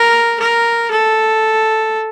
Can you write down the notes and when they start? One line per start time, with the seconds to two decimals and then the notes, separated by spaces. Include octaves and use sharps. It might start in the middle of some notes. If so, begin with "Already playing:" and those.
Already playing: A#4
0.40 A#4
0.91 A4